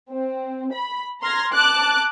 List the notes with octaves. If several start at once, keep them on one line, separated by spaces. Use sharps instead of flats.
C4
B5
A#5 C6 F6 G#6 A#6
A5 D6 F#6